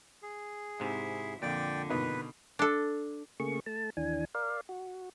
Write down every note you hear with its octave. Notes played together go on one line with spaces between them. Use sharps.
G#4
G#2 C3 E4
F2 A#2 D3 D5 G5
B2 D#3 B4
D4 A4
C#3 A3 A#3 G#4 C#6
A3 A5
D#2 E3 D4 G#5
A#4 D5 F5
F#4